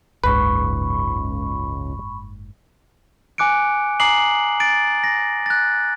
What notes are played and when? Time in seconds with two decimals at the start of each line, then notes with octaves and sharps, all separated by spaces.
0.24 F#1 C#2 G#2 B4 B5 C#6
3.38 G#5 D6 F#6 C#7 D7
4.00 G#5 A#5 D6 D#6 C7 F#7
4.60 A6 D7
5.04 A#6
5.46 F#6 A6